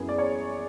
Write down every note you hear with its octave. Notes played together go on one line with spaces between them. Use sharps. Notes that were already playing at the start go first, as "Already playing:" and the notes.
Already playing: F#2 E3 B3 G#4
D5
C#5